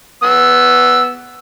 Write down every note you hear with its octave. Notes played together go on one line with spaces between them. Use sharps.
B3 E6